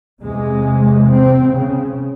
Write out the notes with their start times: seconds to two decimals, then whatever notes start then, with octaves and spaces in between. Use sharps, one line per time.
0.22 E2 C3 G#3
1.11 C4
1.55 C#3